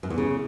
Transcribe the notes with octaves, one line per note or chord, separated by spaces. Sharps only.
F#2
E2
C#3